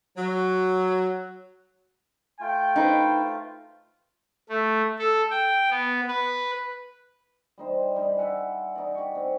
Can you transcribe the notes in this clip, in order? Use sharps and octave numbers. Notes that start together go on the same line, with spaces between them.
F#3
A3 F4 G5
D#4 B4 C5
A3
A4
G5
B3
B4
G3 D#4 C5
G3 D#4 B5
D5 E5 F#5 G#5
D#4 D5
G4 C#6
C3